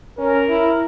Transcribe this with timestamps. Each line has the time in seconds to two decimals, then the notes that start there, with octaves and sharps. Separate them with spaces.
0.18 C#4 A#4
0.49 E4